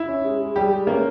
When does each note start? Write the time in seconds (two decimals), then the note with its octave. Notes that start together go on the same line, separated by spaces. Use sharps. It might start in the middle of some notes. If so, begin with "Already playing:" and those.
Already playing: E4
0.08 C#4
0.24 G#3
0.40 G#3
0.56 G3 G#3 G4
0.72 G#3
0.87 A#3 C#4 A#4